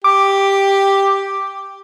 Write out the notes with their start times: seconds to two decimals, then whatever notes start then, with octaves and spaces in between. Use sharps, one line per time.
0.04 G4 D6